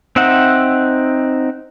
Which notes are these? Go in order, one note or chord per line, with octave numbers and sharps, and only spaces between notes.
C4 D#4 E5 F#5